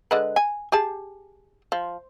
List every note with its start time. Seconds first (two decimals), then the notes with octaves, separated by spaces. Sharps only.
0.11 D3 G#3 B4
0.36 G#5
0.72 G4 G#4 A5
1.72 F3